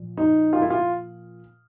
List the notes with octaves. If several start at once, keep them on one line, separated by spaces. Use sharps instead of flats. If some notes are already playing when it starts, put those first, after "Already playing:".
Already playing: A#2 F3
D#4
F4
E4
F4